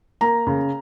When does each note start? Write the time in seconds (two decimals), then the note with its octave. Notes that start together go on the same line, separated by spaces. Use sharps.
0.21 A#3 A#5
0.47 C#3